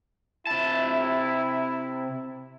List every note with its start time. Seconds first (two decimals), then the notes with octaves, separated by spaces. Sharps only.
0.47 C3 E4 A5